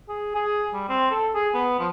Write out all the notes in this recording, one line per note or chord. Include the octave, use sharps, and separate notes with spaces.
G#4
G#4
G3
C4
A4
G#4
B3
F3